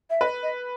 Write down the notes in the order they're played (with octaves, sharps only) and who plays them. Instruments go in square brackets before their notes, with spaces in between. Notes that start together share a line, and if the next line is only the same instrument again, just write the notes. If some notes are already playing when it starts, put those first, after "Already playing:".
[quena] E5
[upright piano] B4 [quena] D#5
[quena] D#5